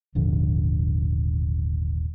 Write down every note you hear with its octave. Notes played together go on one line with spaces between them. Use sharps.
D#1 G#1 D3 F3